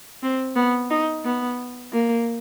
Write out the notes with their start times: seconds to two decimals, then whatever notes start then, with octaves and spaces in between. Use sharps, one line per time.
0.23 C4
0.56 B3
0.90 D#4
1.25 B3
1.93 A#3